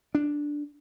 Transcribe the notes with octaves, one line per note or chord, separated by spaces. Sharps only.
D4